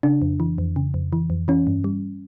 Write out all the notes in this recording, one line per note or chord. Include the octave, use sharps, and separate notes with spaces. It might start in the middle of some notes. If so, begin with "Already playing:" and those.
C#3 D4
F2
E3
F2
C#3
F2
E3
F2
E3 C#4
G2
G3